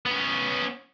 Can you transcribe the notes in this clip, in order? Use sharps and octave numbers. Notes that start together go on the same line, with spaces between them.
B3 C#4